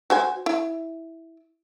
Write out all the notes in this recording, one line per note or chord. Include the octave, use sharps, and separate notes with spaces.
F#4 C5 G#5
E4